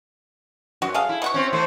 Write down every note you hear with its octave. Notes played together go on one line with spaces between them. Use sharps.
F#2 F#4
G#4 A4 F5
E4
B2 F#5 C#6
C4 C#4
E3 A3 C5